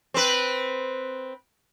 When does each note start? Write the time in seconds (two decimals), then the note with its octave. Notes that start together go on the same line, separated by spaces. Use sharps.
0.14 C4 B4